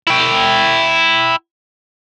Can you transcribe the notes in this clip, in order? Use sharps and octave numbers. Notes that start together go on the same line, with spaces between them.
E4 G5